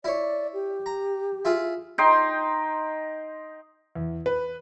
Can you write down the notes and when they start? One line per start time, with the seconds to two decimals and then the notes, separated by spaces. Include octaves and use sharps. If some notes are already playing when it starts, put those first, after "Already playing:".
0.04 E4 C#5 D5
0.54 G4
0.86 A#5
1.45 E4 F4 G#4
1.98 D#4 G5 C6
3.95 E2
4.26 B4